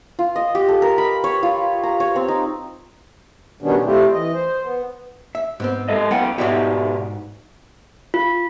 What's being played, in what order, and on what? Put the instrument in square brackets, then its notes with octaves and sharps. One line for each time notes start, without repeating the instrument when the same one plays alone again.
[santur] F4
D#5
G4
A4
A#4
B5
C#5
F4
A#5
C#5
C4
D#4
[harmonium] B2 D#3 G3 B3 C#4 D4
G3 A3 C4 E4 F4 G4
E3 D#5
C5
B3
[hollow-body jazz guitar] E5
G#2 B3 C4
[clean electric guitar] G#3 A4 D#5
[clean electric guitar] F#2 G5 [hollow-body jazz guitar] B3 F#5
[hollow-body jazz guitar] G#2 B3 F#4 [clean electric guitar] B2 G4 D5
[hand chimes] F4